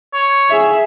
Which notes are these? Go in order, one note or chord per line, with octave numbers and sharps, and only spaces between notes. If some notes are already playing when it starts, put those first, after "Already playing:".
C#5
G#4 E5